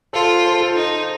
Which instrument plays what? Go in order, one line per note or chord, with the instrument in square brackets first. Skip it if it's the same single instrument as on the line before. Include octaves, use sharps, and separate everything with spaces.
[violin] F4 [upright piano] A4 C5
[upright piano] A4 C5
F4 A4
[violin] D#4